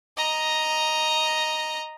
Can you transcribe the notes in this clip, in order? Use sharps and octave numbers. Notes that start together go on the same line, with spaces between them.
D#5 A#5